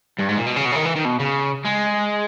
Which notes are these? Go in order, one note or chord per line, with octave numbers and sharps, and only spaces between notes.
G2
G#2
A#2
B2
C#3
B2
C#3
D#3
E3
D#3
B2
C#3
G#3